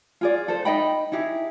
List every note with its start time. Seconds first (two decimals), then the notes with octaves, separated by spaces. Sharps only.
0.21 F4 G#4 D5
0.48 A4 C5
0.65 D#4 D#5 G5 B5
1.12 D#4 E4 G4 G#4